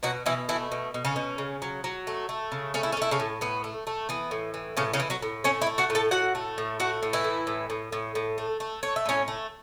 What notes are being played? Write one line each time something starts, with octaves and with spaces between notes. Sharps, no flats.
B2 F#3 F#4
B2 E3 E4
E3 A3 E4
B2
B2
C#3 C#4
B2
C#3
F#3
F#3
A3
A3
C#3
A3 C#4
E4
C#4
A3 E4
C#3 C#4
A2
A2 B3
A3
A3
E3 B3
A2
E3
A2 C#3 C#4
C#3 C#4
E3
F#3 F#4
A2
A3 C#4 C#5
E4 E5
A3
F#4 F#5
A2
A4 A5
A2 F#4 F#5
A3
A2
A3 F#4 F#5
A2
E3 E4
A2
A2
A2
A2
A2
A3
A3
A3 C#5
E5
A2 C#4 C#5
A3